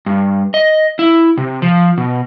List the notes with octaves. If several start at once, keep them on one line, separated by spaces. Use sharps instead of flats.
G2
D#5
E4
C3
F3
B2